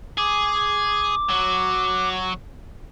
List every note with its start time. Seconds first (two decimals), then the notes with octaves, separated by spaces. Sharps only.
0.18 G#4 D6
1.29 F#3 F#4